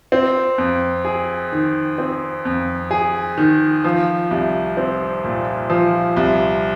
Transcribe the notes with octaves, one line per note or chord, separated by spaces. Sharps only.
C4
F2
G#4
D#3
C4
F2
G#4
D#3
F3
C2
C4
A#2
F3
C2